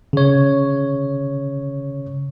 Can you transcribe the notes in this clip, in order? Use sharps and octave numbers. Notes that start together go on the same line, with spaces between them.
C#3 C#5